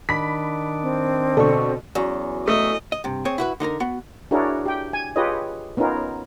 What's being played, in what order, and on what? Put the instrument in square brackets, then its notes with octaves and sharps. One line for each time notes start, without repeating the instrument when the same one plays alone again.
[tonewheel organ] D#3 D4 [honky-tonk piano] B5 B6
[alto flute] C4
[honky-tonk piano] B2 D3 [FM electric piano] A4 D5 C#6
[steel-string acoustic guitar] E2 [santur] F#3 C#4
[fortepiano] A3 [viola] D#5
[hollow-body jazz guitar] D#5
G2 C3
C4 G#4 C#5
E4 F#4 B4
D3 D#4 A#4 A#5
B3 F#4
[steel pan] D4 E4 F#4 G#4 A#4 C#5
G4 G5
G#5
F4 G4 G#4 B4 C#5 D#5
B3 C#4 D#4 F4 A#4